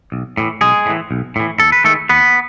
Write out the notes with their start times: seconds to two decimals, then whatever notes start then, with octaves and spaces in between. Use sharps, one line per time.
0.12 B1
0.37 A2 E3
0.61 B1 G#3 G#4
0.86 A2 E3
1.11 B1
1.36 A2 E3
1.60 D#2 A4
1.72 B4
1.84 D#3 G#3 A3 A4
2.09 D#2 B3 B4